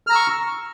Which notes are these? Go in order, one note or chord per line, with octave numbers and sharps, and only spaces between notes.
A#5 C#6 E6 F6